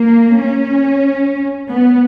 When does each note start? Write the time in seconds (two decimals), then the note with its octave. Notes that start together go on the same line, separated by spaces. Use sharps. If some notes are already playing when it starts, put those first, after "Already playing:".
Already playing: A#3
0.42 C#4
1.69 B3